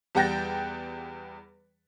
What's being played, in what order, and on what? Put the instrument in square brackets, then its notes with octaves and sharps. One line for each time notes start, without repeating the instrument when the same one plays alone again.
[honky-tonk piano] E2 G3 F#5 G5 A6 A#6